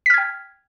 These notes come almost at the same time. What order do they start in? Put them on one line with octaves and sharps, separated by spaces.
B6 F6 G#6 G5